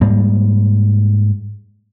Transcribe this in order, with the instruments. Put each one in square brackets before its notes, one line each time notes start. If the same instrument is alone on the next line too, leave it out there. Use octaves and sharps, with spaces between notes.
[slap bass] G#2 G3 A#3